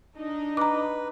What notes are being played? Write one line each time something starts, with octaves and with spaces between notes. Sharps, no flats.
D4 D#4 D#5
B4 A#5 D6